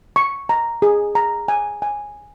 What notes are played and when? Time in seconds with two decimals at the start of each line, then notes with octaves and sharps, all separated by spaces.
0.16 C#6
0.49 A#5
0.82 G#4
1.15 A#5
1.48 G#5
1.82 G#5